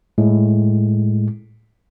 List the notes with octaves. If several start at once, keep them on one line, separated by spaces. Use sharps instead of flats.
A2 G#3